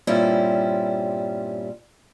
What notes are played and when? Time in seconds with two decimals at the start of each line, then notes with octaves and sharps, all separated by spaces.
0.07 G2 A#2 G3 C4 C#4 E4